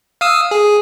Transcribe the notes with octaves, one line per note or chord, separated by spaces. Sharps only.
F5 D#6 E6
G#4